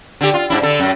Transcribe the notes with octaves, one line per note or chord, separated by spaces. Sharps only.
D3 G4
F4
G#2 D4 E4
D3 A4
F#2